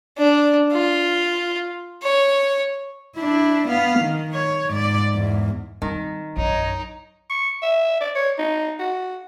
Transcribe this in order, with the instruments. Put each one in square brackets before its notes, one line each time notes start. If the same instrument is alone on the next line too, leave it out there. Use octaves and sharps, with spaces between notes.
[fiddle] D4
F4
C#5
[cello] D4 E4
B3 F5
D#3
C#5
G#2 D5
E2 G#2
[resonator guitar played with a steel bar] D#3 [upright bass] G3 C4
[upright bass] A#1 F#2 [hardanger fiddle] D#4 [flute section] C#5 D#5
[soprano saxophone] C#6
E5
D5
C#5
D#4
F#4